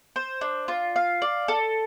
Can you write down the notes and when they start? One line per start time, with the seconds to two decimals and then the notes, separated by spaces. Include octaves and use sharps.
0.16 C5
0.41 D4
0.68 F4
0.96 F5
1.22 D5
1.48 A4